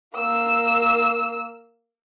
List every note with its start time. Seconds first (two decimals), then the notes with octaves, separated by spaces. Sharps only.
0.16 A#3 E6